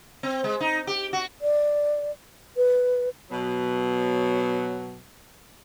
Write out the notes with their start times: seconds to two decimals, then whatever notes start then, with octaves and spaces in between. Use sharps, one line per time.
0.23 C4
0.44 G#3
0.61 D#4
0.87 G4
1.13 F#4
1.42 D5
2.57 B4
3.30 B2 F#3